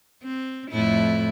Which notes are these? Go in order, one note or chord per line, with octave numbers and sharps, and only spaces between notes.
C4
F2 A2 E4